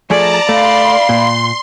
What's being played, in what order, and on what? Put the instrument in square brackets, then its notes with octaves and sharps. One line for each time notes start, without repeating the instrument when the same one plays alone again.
[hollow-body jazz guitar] F3 A3 G#4 [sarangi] D5 [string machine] A5 A#5
[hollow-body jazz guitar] A3 [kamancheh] F5 B5 [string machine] C6
[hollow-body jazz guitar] A#2